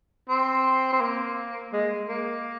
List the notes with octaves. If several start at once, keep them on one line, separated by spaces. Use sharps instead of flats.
C4
C4
A#3
G#3
A#3